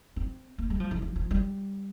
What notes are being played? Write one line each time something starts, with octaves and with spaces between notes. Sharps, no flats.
C4
A#3
G3
F3
E3
F3
F3
G3